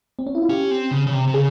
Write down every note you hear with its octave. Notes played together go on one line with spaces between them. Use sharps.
C4
C#4
E4
F4
C#4 G4
C4
C#3
C#3
C3
C3
C#3 G#4